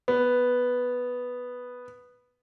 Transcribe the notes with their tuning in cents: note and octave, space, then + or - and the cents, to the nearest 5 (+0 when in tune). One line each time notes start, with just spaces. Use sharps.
B3 +0